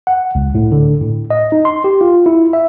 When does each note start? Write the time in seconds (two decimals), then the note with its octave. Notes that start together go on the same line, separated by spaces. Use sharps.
0.07 F#5
0.35 C#2
0.55 A2
0.72 D3
1.01 A2
1.31 D#5
1.52 D#4
1.65 C6
1.84 G4
2.01 F4
2.26 E4
2.53 E5